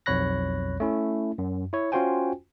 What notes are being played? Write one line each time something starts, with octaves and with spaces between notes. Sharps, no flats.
B1 F2 C#5 B5 F#6 A#6
A3 C#4 E4
F#2
E4 C#5
C#4 F4 F#4 C5 G5 G#5